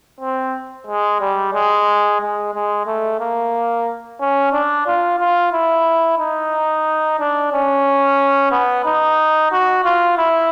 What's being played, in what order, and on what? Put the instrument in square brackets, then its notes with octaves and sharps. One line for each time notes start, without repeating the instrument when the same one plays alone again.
[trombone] C4
G#3
G3
G#3
G#3
G#3
A3
A#3
C#4
D4
F4
F4
E4
D#4
D4
C#4
B3
D#4
F#4
F4
E4